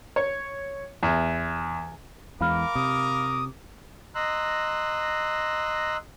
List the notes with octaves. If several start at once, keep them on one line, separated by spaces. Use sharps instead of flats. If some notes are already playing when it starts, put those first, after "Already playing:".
C#5
E2
E2 E3 G#3 A#4 F5 B5 D6 F6
C3 D#6
D#5 A#5 C6 E6 F#6